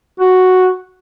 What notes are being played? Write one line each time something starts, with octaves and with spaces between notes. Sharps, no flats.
F#4